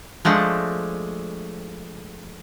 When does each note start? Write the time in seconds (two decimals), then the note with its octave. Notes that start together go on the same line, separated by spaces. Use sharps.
0.25 F3 G#3 A3 D4